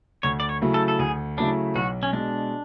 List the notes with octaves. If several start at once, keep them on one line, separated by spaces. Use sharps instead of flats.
D2 C#5
D5
C#5
C#3 F#3 A3 E4
A4
A4
D2 G#4
C#3 F#3 A3 D4 E4
B1 F#4
C#4
B2 G#3 D4